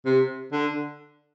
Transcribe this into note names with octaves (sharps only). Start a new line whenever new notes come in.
C3
D3